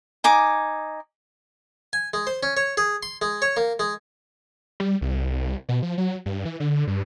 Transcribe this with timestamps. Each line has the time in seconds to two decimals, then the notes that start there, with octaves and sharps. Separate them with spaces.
0.24 D#4 G#5 D6
1.93 G#5
2.14 G#3
2.27 C5
2.43 C#4
2.57 C#5
2.77 G#4
3.03 C6
3.22 G#3
3.42 C#5
3.57 A#3
3.79 G#3
4.80 G3
5.01 C2
5.69 B2
5.82 F3
5.98 F#3
6.26 G2
6.45 E3
6.60 D3
6.87 G2